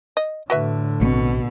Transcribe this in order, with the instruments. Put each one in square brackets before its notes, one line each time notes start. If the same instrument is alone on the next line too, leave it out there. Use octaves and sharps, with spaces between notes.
[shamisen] D#5
[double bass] A2 D3 [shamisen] F#4 B4 E5
[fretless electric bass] A#1 E3 C4 [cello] B2